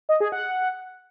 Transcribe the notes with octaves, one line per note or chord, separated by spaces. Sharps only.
D#5
G#4
F#5